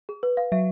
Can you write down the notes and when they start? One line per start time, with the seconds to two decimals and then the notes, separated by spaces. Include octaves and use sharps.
0.09 G#4
0.23 B4
0.37 F5
0.52 F#3 E5